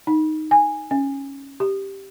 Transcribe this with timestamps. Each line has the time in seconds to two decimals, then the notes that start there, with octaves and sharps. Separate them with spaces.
0.07 D#4
0.51 G#5
0.91 C#4
1.60 G4